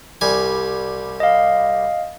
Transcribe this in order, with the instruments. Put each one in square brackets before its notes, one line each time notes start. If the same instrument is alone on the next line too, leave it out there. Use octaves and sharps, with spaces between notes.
[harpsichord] C2 G3 G#5
[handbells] D#5 F5